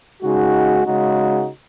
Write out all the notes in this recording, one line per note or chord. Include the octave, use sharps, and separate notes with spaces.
C#3 G#3 D#4 F#4
C#3 G#3 D#4 F#4